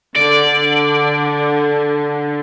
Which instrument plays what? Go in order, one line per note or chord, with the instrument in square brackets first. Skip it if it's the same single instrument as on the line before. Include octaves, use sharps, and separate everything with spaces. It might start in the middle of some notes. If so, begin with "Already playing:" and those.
[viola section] D3 [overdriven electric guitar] D5